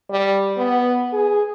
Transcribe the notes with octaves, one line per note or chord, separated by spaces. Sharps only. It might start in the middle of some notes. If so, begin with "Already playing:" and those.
G3
B3
G#4